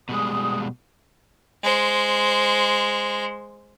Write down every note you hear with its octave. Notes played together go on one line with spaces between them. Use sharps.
B2 G3 G#3 D#6
G#3 C5